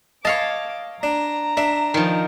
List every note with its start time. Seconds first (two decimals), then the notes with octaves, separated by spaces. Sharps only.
0.25 C#5 D#5 F5 A5 D6
1.03 D4 A#5
1.57 D4 E5
1.94 D#3 F3